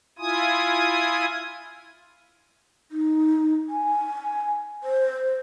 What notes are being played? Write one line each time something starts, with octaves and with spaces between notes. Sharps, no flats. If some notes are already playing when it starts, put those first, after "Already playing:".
E4 F4 G#5 D#6
D#4
G#5
C5